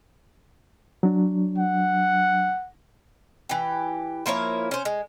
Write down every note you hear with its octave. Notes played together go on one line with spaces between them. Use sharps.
F#3 D4
F#5
E3 G4
F3 A#3 E4 C#5
C#4 C5
G#3